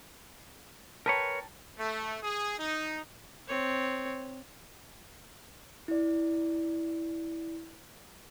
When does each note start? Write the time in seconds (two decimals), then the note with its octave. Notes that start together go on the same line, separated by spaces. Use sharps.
1.06 A#4 B4 C#5 G5 A5 A#5
1.78 A3
2.22 G#4
2.57 D#4
3.48 C4 C#5
5.88 E4 D5